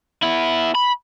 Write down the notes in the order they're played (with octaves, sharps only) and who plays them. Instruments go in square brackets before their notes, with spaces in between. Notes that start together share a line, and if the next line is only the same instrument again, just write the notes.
[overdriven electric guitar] B3 E4
B5